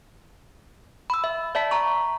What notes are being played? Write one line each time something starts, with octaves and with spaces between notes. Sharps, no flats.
B5 E6
E5
D5 E5 A5 B6
A#5 C#6